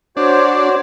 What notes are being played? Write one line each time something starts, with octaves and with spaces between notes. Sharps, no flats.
D4 F#4 C5 C#5